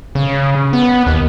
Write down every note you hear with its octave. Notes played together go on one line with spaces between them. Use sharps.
C#3
B3
D#2